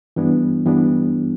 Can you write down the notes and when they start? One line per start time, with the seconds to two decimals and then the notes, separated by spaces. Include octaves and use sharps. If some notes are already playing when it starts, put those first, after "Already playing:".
0.16 G2 E3 G3 B3 D4
0.65 G2 E3 G3 B3 D4